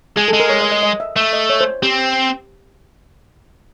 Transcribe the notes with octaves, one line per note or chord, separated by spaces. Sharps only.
G#3 G#4
A4
G#3
A#4
C#5
D#5
D#5
D#5
E5
A3 E5
D#5
C#5
C5
C4 G4